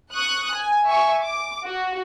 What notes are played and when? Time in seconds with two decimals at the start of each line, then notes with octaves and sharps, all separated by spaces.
0.13 C#6 D#6 F#6
0.53 G#5
0.86 E5 G#5 C#6
1.24 D6
1.67 F#4